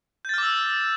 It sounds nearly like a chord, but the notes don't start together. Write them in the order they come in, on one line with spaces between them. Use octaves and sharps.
G6 A6 F6 D6 E6